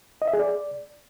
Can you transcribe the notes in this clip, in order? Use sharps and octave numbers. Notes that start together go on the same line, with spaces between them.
D#5
E5
G#4
D5